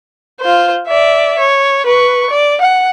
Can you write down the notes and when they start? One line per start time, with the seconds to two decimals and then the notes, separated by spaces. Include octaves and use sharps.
0.41 F4 C5
0.87 D5 E5
1.39 C#5
1.86 B4 C#6
2.30 D5
2.61 F#5